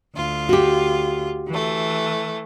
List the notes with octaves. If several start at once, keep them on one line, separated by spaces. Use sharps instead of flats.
D2 F4
F#4 G4
E3 A3